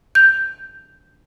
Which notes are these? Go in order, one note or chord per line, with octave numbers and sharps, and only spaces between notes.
G6